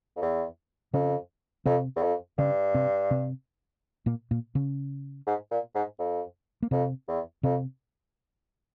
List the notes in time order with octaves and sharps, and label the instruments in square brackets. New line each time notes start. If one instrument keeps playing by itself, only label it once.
[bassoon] F2
E2
[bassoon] F2 [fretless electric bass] C#3 C#4
[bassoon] F2 [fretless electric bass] C3 C4
[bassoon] E2
F2
[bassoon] G2 [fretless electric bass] C#3 C#4
[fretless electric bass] C3 C4
C3 C4
A#2 A#3
A#2 A#3
C#3 C#4
[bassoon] G#2
A#2
G#2
F2
[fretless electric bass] A#3
[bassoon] F2 [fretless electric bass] C3 C4
[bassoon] E2
[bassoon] F2 [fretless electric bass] C3 C4